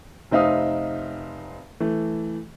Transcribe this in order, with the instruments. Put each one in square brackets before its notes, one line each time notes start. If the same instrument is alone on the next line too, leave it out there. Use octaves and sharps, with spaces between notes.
[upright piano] F1 C4 D#4 E5 F5 D#6
E3 A3